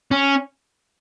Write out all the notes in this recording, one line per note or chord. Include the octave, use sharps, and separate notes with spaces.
C#4